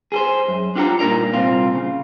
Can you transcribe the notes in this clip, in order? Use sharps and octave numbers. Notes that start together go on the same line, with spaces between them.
G#4 A4 C5
F#2
D4 F4 G4 A#4 F#5 A#5
G2 A#2 D#4 A#4 D5 A#5
C2 A#2 C4 F4
C#3